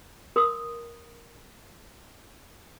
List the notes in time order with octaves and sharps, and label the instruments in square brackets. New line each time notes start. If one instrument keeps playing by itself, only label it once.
[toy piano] A#4 C6 D#6